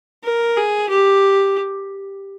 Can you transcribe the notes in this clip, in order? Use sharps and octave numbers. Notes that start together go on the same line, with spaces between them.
A#4
G#4
G4